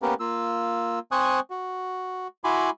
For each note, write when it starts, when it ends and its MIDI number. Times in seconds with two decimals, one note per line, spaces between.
0.02 0.14 58
0.02 0.14 59
0.02 0.14 61
0.02 0.14 67
0.02 0.14 70
0.02 0.14 71
0.20 0.99 58
0.20 0.99 65
0.20 0.99 88
1.12 1.40 60
1.12 1.40 72
1.12 1.40 80
1.12 1.40 85
1.12 1.40 87
1.12 1.40 90
1.50 2.28 66
2.44 2.70 64
2.44 2.70 66
2.44 2.70 80
2.44 2.70 83
2.44 2.70 84
2.44 2.70 86